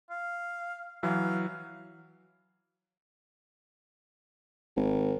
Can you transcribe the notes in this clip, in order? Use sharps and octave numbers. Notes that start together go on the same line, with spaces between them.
F5
E3 F#3 F5
G#1